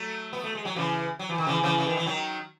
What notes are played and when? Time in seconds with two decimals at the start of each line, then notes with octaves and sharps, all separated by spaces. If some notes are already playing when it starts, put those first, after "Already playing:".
Already playing: F#3 A3
0.33 B3
0.44 A3
0.55 G#3
0.65 F#3
0.76 C#3 E3
1.19 F#3
1.29 E3
1.38 D#3
1.47 C#3 E3
1.63 C#3 E3
1.78 C#3
1.87 D#3
1.97 E3
2.06 D#3 F#3